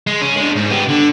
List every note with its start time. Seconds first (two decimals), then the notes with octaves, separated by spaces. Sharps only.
0.07 G#3
0.21 C#3 C#4
0.36 G#3 D4
0.56 G#2
0.70 B3 G4
0.88 D3